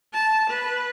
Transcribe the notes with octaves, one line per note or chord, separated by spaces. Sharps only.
A5
B4